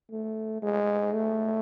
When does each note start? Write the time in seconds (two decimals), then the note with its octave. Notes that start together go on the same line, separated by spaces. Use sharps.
0.11 A3
0.62 G#3
1.14 A3